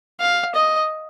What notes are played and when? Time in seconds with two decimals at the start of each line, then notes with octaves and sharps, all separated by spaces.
0.21 F5
0.55 D#5